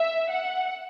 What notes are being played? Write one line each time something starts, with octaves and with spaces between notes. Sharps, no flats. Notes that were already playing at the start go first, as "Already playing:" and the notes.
Already playing: E5
F#5